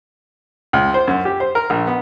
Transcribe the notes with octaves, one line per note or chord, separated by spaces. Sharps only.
C#2
C5
F#2
G4
C5
A#4
A#1
B3